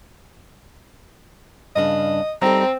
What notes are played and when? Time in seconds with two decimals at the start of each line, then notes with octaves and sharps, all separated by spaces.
1.76 G2 C#3 D4 D#5
2.42 G3 C4 D#4 A4 A#5